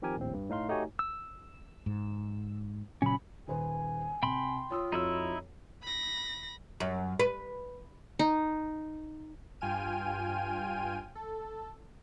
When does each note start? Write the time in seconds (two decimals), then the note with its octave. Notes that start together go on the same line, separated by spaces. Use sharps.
0.02 D#3 F3 C4 G4 A#4 G#5
0.17 A#1 D#2 A2 C4
0.33 G2
0.49 A2 D#4 F5 C6
0.69 A3 D#4 F#4 G4 C#5 G#5
0.99 E6
1.86 G#2
3.02 A#2 C#3 F#3 C#4 B5
3.48 D#1 B4 C5 G#5
4.23 C3 G5 B5 C6
4.71 F4 C#5 D#6 E6
4.92 F2 D#4 E4 F#4 C#5 E6
5.83 B5 A#6
6.80 F#2
7.19 B4
8.19 D#4
9.61 G2 F4 G5 G#5 F6 D#7
11.15 A4